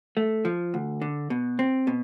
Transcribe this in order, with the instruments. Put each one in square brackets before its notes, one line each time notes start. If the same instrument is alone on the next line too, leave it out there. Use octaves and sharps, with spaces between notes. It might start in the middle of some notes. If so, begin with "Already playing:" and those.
[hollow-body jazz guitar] A3
F3
D2
D3
B2
C4
B2